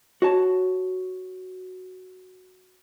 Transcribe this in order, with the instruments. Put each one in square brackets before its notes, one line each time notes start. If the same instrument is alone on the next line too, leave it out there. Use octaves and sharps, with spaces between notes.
[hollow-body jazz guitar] F#4 C#5 A5